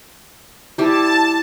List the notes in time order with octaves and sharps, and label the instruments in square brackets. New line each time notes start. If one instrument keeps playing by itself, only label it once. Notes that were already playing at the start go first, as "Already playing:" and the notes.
[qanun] G3 E4 [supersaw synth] A5